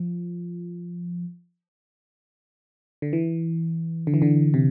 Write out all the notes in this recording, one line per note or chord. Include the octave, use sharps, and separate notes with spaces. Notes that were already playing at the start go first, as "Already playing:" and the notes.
Already playing: F3
D3
E3
D3
E3
D3
C3